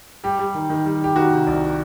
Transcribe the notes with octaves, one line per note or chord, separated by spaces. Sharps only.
G3 G4
G3
D#3
D#3
G3
G3 G4
D#3 F#4
C3
C2